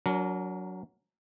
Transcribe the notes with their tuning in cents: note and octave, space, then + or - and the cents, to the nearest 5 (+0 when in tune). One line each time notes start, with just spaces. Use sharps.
F#3 +0 D4 -40 A#4 +0